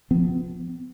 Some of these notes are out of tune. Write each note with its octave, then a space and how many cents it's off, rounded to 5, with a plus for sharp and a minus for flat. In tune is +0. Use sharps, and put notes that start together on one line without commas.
F3 +0 B3 +40